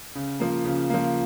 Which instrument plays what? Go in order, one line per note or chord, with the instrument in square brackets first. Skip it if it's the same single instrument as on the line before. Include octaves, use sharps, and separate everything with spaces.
[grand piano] C#3
F3 A#3
C#3
F3 A#3